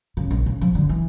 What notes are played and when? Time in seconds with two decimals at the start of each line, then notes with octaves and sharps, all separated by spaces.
0.17 C#3
0.31 A#1
0.46 C#3
0.61 F3
0.75 D3
0.89 E3